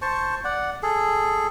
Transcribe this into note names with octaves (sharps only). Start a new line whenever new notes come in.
C5 A5 C#6
D5 F#5
G#4 A4